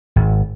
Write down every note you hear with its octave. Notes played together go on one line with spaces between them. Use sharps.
G#1